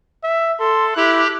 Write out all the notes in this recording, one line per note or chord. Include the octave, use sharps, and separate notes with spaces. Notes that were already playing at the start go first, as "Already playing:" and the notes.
E5
A4 C6
E4 G4 F#6